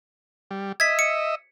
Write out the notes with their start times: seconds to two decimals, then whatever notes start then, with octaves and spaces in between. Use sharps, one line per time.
0.51 G3
0.80 D#5 E5 G#6 B6
0.99 C#7